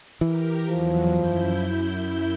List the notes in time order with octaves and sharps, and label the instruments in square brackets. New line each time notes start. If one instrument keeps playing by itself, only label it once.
[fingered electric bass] E3 [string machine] G4 A#4
[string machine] E2 F#3 [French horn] F3
[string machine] F#2 E4 G6